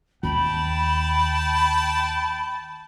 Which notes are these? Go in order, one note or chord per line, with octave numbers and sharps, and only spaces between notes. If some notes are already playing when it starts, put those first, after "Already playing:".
D#2 G5 A5 B5